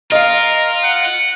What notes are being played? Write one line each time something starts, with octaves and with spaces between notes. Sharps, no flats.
F4 A#4 D#5 F5
F#5